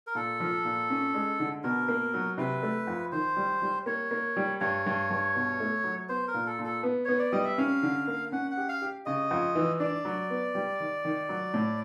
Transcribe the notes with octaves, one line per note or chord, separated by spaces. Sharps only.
A#4
A#2 A4
F3
A#2
C#4
G#3
D3
B2 A#4
A#3
F#3
C3 B4
A3
F2
D#3 C5
G3
G3
A#3 C#5
A#3
G3
G2 C#5
G2
G2
B2
A3
F#3
B3 C5
A#4
A#2
A4
A#2
A4
B3
B3 C#5
D5
G3 D#5
E5
C#4 F5
D3
A#3
C#4 F#5
F#5
G4
F5
G4
C#3 D#5
F2
E3
D4 D5
F#3
B3
G3
D#3
D#3
F#3
A2